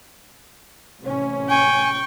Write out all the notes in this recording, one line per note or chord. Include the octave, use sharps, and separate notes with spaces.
A1 C3 C#4
G5 G#5 C#6